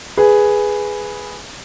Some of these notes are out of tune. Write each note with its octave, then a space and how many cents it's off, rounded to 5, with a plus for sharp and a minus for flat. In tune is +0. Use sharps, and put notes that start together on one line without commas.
G#4 +0 B4 +0